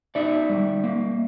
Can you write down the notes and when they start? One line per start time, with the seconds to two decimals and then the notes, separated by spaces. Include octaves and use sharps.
0.15 D#4 D5 E5
0.50 G3
0.84 A#3